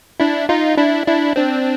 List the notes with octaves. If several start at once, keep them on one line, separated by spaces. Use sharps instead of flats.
D4 E4
D#4 F4
D4 E4
D4 E4
C4 D4